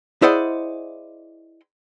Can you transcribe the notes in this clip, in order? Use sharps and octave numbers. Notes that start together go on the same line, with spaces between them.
E4 G#4 C5 D5 D#5 F#5